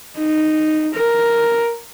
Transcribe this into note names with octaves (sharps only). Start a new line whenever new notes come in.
D#4
A#4